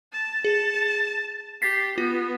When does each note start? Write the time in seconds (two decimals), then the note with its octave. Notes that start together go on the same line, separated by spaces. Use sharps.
0.13 A5
0.44 G#4 A5
1.62 G4 A6 B6 C7
1.98 B3 F4